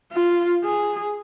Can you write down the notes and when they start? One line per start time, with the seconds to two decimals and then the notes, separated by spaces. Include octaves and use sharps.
0.12 F4
0.64 G#4